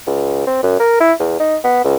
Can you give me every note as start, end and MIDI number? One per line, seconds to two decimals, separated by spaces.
0.07 0.46 37
0.47 0.62 60
0.63 0.75 42
0.80 0.96 70
1.00 1.13 64
1.20 1.36 40
1.40 1.57 63
1.64 1.82 59
1.84 1.96 37